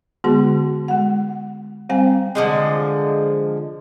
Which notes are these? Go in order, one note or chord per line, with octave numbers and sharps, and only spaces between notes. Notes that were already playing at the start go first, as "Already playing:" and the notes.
D3 G#3 B3 F#4 G#4 C6
G#3 F#5
G3 C4 C5 F5 G5 G#5
D3 F3 G#3